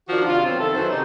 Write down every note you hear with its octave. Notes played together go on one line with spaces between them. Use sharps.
D#3 F3 D4 F#4
C3 F4
D#3 F#3 B3 C4
F2 D#3 E4 A4
D#3 F#3 C#4 B4 C5
C3 D#4